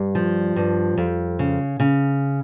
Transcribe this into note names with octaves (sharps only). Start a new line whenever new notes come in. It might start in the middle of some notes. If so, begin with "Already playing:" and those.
Already playing: G2 G3
F3
G2
F2
C#3
C#3